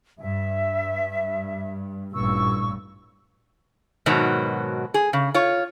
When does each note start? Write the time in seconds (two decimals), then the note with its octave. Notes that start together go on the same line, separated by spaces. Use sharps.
0.20 G2 E5
2.13 A1 G2 A#2 C#6 E6
4.06 G#2 B2 D#3 F#3
4.94 G#4
5.13 C#3
5.34 F4 C#5